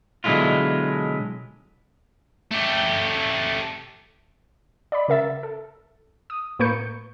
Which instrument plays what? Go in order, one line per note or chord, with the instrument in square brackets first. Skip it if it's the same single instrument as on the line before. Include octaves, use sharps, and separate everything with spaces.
[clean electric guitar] B2 D3 F#3 G#3 E4 F4
[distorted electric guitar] A3 G4
[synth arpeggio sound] D5 D#5 B5
C#3 A#4 E5 A6
A4
D#6
A2 A#3 B4 C#6 G6 C#7